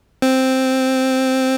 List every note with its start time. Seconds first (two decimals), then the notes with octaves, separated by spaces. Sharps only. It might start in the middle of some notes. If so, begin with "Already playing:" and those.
0.22 C4